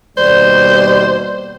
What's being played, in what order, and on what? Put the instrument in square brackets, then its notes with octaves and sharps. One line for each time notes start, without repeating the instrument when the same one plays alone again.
[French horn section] D#2 B2 G3 [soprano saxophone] C5 [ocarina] D5